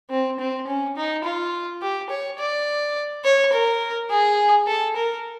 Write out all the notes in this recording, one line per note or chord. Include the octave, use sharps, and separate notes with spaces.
C4
C4
C#4
D#4
F4
G4
C#5
D5
C#5
A#4
G#4
A4
A#4